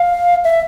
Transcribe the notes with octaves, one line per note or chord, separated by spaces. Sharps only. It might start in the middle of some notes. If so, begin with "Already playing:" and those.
Already playing: F5
E5